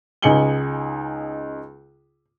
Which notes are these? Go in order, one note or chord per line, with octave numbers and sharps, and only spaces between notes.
C#2 D#4 G#5 C#7 F#7 G7